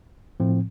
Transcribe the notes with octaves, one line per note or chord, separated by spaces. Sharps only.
A2 F3 C4